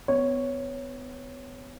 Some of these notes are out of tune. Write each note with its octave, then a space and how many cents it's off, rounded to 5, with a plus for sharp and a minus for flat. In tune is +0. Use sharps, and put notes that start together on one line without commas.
B3 +30 C#5 +0